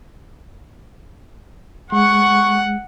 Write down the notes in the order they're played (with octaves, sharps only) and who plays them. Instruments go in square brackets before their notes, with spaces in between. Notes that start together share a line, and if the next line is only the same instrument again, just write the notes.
[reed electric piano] G#3 [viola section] F#5 [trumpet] C#6